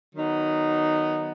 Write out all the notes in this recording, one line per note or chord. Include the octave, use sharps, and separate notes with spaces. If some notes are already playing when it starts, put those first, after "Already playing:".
D#3 F#3 B3 D#4